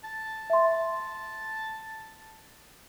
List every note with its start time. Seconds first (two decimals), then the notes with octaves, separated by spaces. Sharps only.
0.04 A5
0.50 E5 C6